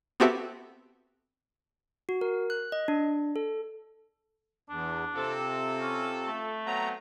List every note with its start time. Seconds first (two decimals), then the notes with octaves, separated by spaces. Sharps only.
0.20 B3 C4 F#4 G4 A4 E5
2.09 F#4
2.21 A#4
2.50 F#6
2.72 D#5
2.88 D4
3.36 A4
4.70 E2 D4
5.15 C3 C4 F4 A4
5.81 C#4
6.27 A3
6.66 F#3 B3 C4 A#5